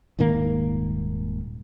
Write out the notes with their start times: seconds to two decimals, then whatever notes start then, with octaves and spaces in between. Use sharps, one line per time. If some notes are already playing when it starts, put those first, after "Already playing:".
0.19 D#1 G#2 D#3 A#3